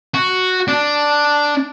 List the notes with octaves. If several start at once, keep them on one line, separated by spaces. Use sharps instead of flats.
F#4
D4